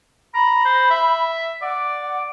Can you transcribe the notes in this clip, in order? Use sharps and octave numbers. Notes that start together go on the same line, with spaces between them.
A#5 B5
C5
E5
D5 F#5